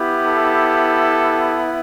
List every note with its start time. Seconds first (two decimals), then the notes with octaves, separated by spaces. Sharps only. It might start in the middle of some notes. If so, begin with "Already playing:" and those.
Already playing: B3 E4 G4
0.25 A4